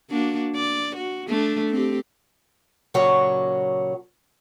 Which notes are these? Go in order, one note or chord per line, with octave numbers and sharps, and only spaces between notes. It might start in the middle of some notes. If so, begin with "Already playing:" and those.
A#3 D4 F#4
D5
F#4
A3 D4
C4 G4
D#2 A#2 C#3 F#3 F#4 C#5